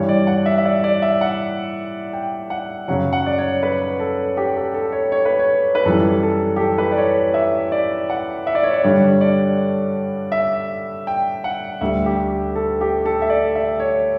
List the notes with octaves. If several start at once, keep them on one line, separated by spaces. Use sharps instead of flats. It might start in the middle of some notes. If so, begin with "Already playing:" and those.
Already playing: G2 E3 G3 C#5
D5
F#5
E5
E5
D5
D5
E5
F#5
G5
F#5
F#2 C#3 F#3 F#5
F#5
D5
C#5
B4
A4
G4
A4
A4
C#5
C#5
B4
C#5
B4
F#2 E3 G3 A4
A4
G4
A4
B4
D5
C#5
E5
D5
F#5
E5
D5
C#5
D5
G2 D3 G3 C#5
D5
E5
G5
F#5
D2 D3 G3 E5
G4
A4
G4
A4
E5
D5
E5
C#5